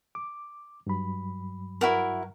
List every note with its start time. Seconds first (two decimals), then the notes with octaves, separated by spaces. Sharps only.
0.15 D6
0.87 G2 F#3 B5
1.81 E4 F#4 A#4